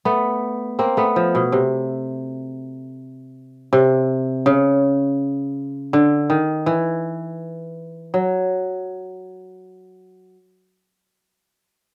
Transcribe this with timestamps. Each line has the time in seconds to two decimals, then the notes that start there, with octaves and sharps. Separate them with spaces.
0.05 A3 B3
0.79 A#3 C4
0.97 A3 B3
1.16 F3
1.35 B2
1.52 C3
3.73 C3
4.46 C#3
5.93 D3
6.30 D#3
6.66 E3
8.14 F#3